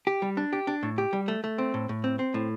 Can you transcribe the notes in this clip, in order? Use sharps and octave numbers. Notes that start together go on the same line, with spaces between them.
G4
G3
D4
G4
D4
A2
G4
G3
A3
A3
C4
A2
A2
C4
C4
A2